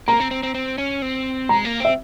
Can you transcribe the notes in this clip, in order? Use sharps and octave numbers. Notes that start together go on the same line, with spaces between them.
A#3 A#5
C4
C4
C4
C4
C#4
C4
G#3 A#5
A#3
C4 E5